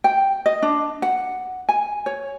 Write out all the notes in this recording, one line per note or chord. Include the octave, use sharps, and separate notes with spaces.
G5
D#5
D4
F#5
G#5
C#5